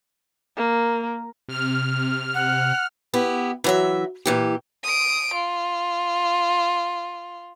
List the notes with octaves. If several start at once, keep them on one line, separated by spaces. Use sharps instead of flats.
A#3
C3 F6
F#5
B3 E4 G4
E3 F#3 E5
A#2 E3 G4
D#6 D7
F4